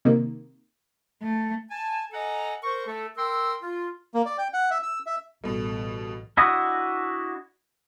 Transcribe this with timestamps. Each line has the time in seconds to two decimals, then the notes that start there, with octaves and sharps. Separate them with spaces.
0.05 C3 D#3 A#3
1.22 A3
1.71 G#5 A5
2.12 A4 D#5 F#5 G#5 A#5
2.63 A#4 C5 C#6
2.87 A3 A4
3.16 A#4 G5 C6 E6
3.62 F4
4.14 A#3
4.25 D5
4.38 G5
4.54 F#5
4.71 E5
4.83 E6
5.06 E5
5.44 A1 G2 B2 A4
6.37 D4 E4 F#4 D#5